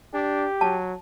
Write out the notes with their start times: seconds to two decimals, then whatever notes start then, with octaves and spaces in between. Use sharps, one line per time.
0.14 D4 G4
0.61 F#3 A5